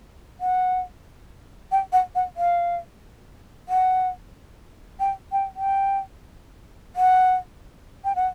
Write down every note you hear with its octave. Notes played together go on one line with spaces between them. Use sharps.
F#5
G5
F#5
F#5
F5
F#5
G5
G5
G5
F#5
G5
F#5